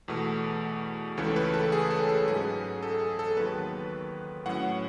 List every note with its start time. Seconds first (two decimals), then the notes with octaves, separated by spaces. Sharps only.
0.08 E2 B2 A3
1.17 C#2 C#3 E3 A3 C#4 A4
1.36 B4
1.54 A4
1.72 G#4
1.90 A4
2.09 A4
2.27 G#2 F#3 C#4 G#4
2.83 A4
3.00 G#4
3.19 A4
3.37 D#2 D#3 F#3 B3 B4
4.46 A2 F#3 C#4 F#5